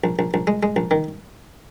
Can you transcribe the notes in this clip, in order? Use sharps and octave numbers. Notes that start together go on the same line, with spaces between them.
A#1
A#1
A#1
G#3
G#3
A#1
D#3